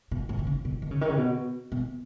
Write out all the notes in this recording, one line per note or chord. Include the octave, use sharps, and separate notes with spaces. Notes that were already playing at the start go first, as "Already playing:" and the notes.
B2
A2
D#3
C#3
B2
D#3
C#3
D#3
C#3
B2
B2